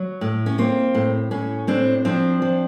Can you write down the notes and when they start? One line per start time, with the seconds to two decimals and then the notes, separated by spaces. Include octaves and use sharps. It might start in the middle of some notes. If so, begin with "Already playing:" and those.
Already playing: F#3
0.21 A2
0.46 C#4
0.58 A#3 C4
0.95 A2
1.31 A2 C#4
1.67 A2 C4 D4
2.05 F3 C4 D4
2.42 F3